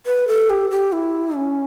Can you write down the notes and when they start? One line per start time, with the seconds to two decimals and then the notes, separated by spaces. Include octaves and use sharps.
0.06 B4
0.28 A4
0.50 G4
0.71 G4
0.92 E4
1.36 C#4